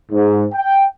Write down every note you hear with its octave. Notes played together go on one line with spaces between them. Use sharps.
G#2
G5